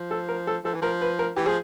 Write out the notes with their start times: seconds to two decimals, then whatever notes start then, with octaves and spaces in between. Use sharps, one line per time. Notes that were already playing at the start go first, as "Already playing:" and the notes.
Already playing: F3
0.11 A4
0.29 A#4
0.47 A4
0.64 F3 A4
0.74 E3
0.82 F3 A#4
1.01 B4
1.19 A#4
1.37 E3 G4
1.46 F3 G#4